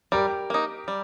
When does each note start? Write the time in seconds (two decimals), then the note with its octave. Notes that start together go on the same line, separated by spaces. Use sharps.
0.12 G3 G4 A#4
0.50 A#3 D#4
0.88 G3